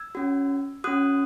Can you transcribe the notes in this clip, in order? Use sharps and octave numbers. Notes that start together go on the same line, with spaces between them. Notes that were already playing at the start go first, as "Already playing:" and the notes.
Already playing: E6 G#6
C#4 F#4
C#4 F#4 D#6 F#6